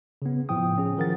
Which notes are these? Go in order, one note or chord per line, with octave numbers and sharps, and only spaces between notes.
C#3 B3
A2 F3 E4 G5 D#6
C#4 G#4
D#3 F3 A#4 F#5 A6